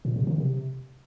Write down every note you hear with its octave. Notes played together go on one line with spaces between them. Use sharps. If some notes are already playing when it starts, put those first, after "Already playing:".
A#2
C3
D#3
C3